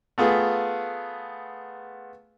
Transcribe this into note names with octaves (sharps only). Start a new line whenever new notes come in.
A3 B3 F4 G#4